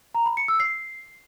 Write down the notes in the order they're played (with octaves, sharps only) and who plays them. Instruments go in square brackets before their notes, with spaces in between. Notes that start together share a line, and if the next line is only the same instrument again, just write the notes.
[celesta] A#5
B5
C#7
E6
C7